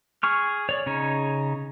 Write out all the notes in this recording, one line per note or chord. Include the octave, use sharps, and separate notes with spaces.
G#4 C#6 F6
C#5 D5
C#3 D#4 C#5